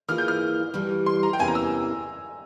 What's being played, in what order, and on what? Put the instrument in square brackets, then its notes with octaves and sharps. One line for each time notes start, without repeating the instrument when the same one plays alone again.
[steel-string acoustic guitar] E3 A#3 F4 G#4 [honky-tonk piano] F6
[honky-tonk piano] G6
F6
[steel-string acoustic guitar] G2 E3 G3
[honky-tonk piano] C6
A#5
G5
[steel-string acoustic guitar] E2 C3 E3 A#3 C#4 [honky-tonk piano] G#5
[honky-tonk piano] A#5
E6